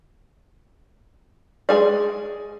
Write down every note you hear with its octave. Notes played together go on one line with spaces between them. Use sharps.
G#3 G#4 D5